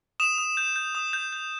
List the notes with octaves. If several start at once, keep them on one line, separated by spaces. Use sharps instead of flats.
D#6 E7
D#6
G6
G6
D#6
G6
G6